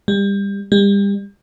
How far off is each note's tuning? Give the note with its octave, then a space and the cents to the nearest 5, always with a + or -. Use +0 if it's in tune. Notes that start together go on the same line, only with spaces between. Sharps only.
G3 +25
G3 +35